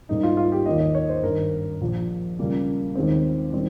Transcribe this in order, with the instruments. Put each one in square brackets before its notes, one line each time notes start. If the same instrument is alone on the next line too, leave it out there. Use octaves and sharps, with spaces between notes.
[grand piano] G#2 G3 A#3 D#4
F4
F4
G4
D#2 D#3 A#3 D#5
D#5
C#5
C5
G#1 G2 D#3 A#4
A#1 A#2 F3
C#2 C#3 G3 A#3
D#2 D#3 G#3 C4
D#3 G3 C4